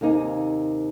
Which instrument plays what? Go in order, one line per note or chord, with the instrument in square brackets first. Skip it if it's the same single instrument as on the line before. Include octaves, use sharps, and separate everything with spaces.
[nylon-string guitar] D#2 C3 A#3 D#4 C5 G#5